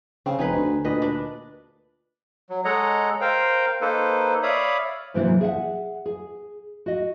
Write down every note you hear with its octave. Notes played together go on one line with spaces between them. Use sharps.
C#3 C4
F1 D#4 G#4 B4
D2
D2 A#2 B4 D#5
D4 B4
F#3
G#3 A4 C#5 D#5 F#5 A#5
A#4 C5 F5 G5
A#3 D#4 A4 B4 C5
C#5 D5 E5 F5 B5 D#6
G#2 C3 E3 F#3 A#3 E4
G#4 E5 F#5
G#4
F#4 D#5